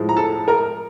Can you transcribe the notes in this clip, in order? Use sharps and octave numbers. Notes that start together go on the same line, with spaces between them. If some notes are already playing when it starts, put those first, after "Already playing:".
Already playing: A2 F3 G#3
A#5
A4 A5
A#4 A#5